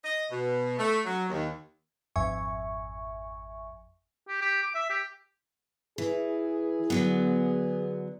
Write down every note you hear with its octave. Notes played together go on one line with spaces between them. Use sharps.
D#5
B2
A3
F#3
D#2
G#1 F2 E5 G#5 C#6
G4
G4
D6
E5
G4
E3 G#4
D3 F#3 B3